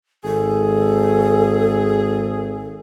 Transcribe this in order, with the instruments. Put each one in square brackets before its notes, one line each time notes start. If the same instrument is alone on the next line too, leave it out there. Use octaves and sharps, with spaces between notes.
[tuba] G#1 [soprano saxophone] G#4 [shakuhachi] A4